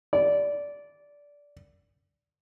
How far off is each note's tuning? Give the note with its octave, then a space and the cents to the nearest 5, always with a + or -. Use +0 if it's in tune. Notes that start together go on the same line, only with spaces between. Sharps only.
D5 -15